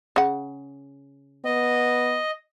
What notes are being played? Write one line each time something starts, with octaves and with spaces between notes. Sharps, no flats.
C#3 F#5
B3 D#5